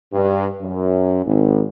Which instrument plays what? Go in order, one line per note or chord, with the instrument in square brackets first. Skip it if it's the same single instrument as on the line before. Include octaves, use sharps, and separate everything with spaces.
[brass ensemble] G2
F#2
G#1